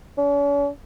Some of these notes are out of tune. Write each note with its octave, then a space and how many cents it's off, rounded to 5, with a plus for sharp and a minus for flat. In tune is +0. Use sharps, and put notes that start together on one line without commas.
C#4 +45